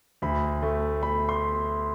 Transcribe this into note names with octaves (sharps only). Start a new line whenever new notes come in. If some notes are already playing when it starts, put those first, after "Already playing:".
D2 B5
A3
A3 B5
C6